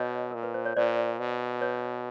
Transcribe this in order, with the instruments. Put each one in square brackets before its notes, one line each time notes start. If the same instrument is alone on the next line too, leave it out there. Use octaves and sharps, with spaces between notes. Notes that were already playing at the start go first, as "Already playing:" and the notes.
Already playing: [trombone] B2 [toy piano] C#5 D#5
[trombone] A#2 [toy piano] A#4
[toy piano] B4
C5
C#5
[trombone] A#2 [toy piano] C5 D5
[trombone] B2
[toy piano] B4 C#5